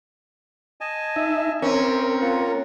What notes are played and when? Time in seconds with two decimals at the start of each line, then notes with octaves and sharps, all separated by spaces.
0.81 D#5 G#5 A5
1.16 D#4 E5
1.62 C4 C#4 A#4 G5
2.21 A#3 F4 F#5